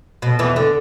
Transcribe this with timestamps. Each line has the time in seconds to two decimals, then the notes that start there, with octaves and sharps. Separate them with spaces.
0.22 B2
0.39 E2 E3
0.56 D3